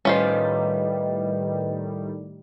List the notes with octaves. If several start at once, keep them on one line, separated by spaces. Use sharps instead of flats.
A2 D#3 G3 C#4 F4 B4 C5 D#5